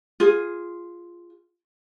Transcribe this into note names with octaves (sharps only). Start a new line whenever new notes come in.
F4 G#4